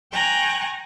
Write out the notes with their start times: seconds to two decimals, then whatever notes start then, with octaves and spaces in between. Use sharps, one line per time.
0.12 G5 G#5 A#5 C#6 F#6 G6